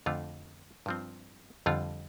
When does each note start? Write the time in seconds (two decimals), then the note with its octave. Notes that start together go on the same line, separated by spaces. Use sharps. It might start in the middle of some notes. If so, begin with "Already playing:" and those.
0.06 F2 D3 A3 F4
0.86 G2 F3 C4
1.66 F2 D3 G3 F4